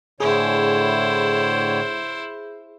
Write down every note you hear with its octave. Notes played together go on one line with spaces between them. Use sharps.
A2 D3 E4 G#4 C5 C#5